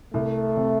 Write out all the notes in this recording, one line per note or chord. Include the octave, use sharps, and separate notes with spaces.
C2 A3
C3